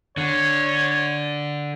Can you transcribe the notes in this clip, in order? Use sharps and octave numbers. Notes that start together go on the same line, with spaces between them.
D3 C#5